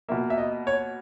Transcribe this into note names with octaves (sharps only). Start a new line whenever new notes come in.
B2 A#3 E5
E5
D#5
C#5